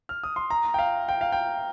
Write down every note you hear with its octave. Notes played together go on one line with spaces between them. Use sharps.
F6
D#6
C6
A#5
G5
F5
G5
F5
G5